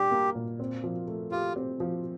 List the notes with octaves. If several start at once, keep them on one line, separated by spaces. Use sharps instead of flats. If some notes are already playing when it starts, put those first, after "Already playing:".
Already playing: A#2 G3 D4 G4
A#3
A#2
C4
F3
A3
F4 G4
C4
F3